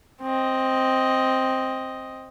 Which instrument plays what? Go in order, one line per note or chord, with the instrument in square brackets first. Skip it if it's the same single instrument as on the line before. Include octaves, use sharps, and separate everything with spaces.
[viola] C4 D#5